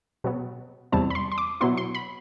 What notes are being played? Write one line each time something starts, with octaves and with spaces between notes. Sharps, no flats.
B2 F#3 B3
E2 C3 G3 C4 E4 A5
B5
C6
C6
D6
B2 F#3 B3 E4 C6
C6
B5